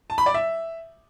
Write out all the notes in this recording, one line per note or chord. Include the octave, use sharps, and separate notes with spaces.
A5
B5
D5
E5